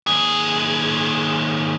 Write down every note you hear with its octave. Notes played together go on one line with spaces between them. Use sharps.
D#2 G#4